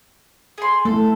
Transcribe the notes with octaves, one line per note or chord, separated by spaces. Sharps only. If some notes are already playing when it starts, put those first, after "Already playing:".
G#4 C6
A3 A4